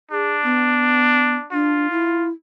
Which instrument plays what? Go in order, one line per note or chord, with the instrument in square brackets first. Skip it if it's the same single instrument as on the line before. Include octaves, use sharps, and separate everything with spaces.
[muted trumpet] D4 [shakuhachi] G#4
[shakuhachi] B3
[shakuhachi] D4 [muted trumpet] F4
[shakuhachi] E4